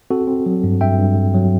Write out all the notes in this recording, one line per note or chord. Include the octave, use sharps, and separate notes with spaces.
C4 F#4 A4
C4
F#3
G2
G2 E5 G5
G2
G2
F#3